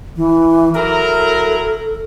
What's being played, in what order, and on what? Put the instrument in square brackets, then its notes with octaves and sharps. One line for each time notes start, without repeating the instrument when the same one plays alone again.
[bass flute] E3
[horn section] F#3 E4 A#4 [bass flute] A4